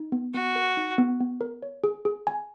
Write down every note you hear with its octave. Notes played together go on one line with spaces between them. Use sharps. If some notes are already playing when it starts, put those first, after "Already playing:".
Already playing: D#4
B3
B3 F#4
A#4
D#4
B3
B3
A#4
C#5
G#4
G#4
G#5